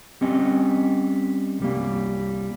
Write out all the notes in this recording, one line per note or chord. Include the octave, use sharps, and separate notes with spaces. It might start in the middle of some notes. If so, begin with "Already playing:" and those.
G3 C4 C#4 D#5
C2 G3 A#3